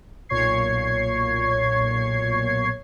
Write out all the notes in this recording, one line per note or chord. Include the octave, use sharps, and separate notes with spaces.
B1 A#2 C#5 C#6 G#6 C7